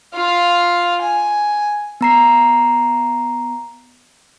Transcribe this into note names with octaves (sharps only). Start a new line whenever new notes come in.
F4 F5
G#5
B3 A#5 C7